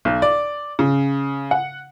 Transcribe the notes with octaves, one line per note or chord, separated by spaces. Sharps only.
B1
D5
C#3
F#5